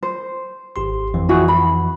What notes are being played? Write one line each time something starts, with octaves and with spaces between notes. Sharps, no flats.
C5
G#1 G4 C6
F2 E3
E4 F#4 G#4
B5